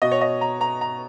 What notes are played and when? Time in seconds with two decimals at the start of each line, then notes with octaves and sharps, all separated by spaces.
0.02 B2 D#5
0.12 C#5
0.21 D#5
0.41 A#5
0.61 A#5
0.81 A#5